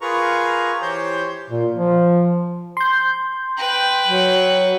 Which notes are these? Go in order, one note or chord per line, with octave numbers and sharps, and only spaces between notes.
F4 G#4 A#4 B4 A#5 C#6
E3 G4 C5 C#5 C6 G6
A#2
F3
C6 G6
B4 G5
F#3